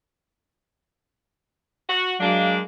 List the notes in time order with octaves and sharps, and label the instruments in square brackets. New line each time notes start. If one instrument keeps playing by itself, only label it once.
[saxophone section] F#4
[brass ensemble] F#3 G#3 F5 [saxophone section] A#3 D4